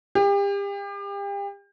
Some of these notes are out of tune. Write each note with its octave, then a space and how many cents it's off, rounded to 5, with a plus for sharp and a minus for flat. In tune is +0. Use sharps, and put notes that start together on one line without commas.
G4 +35